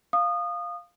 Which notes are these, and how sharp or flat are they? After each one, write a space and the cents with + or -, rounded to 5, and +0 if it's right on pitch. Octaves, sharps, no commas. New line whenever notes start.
F5 +0 D#6 -25